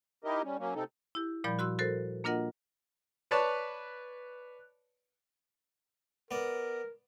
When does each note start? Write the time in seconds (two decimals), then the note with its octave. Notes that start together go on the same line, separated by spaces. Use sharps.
0.24 D#4 E4 G4 A#4 D#5
0.44 G3 C#4
0.58 F#3 A#3 C#4
0.75 C3 C4 D#4 A4
1.15 E4 G4
1.44 A#2 F3 G3 D5 B5 G6
1.59 F#4 C6 E6 F#6
1.79 F#4 A4 A#4 C5
2.24 A#3 D4 F4 A#4 D#5 F#5
3.31 B4 C#5 D5 A5
6.31 B3 A#4 D5